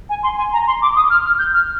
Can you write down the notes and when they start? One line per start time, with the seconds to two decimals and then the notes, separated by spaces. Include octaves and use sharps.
0.09 G#5
0.23 C6
0.38 G#5
0.53 A#5
0.67 C6
0.82 D6
0.96 D#6
1.10 F6
1.25 F6
1.39 G6
1.54 F6